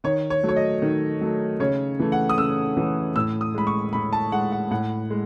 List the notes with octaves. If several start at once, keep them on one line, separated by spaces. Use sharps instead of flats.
D#3 C#5
C#5
F#3 A3
C#5
D#5
D#3
F#3 A3
C#3 C#5
E3 A3
F#5
D#6
C#3 E6
E3 A3
A2 E6
D#6
G#3 B5
C#6
A2 B5
A5
G#3 F#5
F#5
A2 F#5
G#3